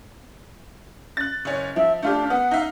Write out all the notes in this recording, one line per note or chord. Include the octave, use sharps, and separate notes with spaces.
F#6 A6
F#1 C#4
F3 E5
A3 D4 F4 G4
B3 F#5
D#4 E5 F5